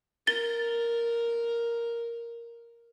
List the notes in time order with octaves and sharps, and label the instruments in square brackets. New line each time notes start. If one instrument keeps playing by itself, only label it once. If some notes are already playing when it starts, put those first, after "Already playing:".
[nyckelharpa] A#4 [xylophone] A6 G7